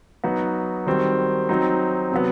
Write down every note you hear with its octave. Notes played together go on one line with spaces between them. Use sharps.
F#3 B3 D#4 F#4
D#3 G3 C4 F#4
F#3 C4 D#4
C3 F#3 B3